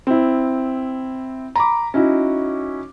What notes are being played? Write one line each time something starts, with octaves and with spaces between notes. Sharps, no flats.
C4 E4
A#5 B5 D6
C#4 D#4 E4 F#4